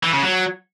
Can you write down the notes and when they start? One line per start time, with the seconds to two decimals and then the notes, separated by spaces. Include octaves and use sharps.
0.03 E3
0.13 C#3
0.23 F#3